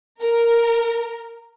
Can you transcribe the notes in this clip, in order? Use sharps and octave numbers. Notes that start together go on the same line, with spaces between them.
A#4